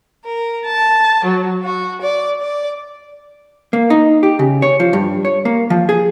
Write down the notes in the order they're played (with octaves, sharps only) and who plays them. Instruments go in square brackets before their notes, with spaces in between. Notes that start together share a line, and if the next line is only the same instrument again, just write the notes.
[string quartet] A#4
A5
F#3
F#4
D5
D5
[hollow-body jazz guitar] A#3
D#4
G4
C#3
C#5
F3
G2
C#5
A#3
F3
G#4